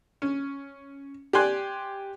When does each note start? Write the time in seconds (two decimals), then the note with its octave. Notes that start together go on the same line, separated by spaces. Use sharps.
0.22 C#4
1.33 G4 D5 G5 G#5 C6 F#6